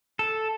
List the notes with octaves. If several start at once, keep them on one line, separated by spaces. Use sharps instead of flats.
A4